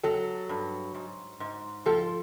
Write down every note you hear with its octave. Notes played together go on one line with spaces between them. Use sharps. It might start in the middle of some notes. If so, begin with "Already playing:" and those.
F#3 A4
G2
G#2
G#2
F3 A4